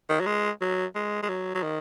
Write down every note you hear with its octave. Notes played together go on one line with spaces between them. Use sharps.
D#3
F#3
G#3
F#3
G#3
G#3
F#3
F#3
D#3